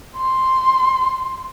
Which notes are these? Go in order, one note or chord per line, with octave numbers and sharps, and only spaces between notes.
C6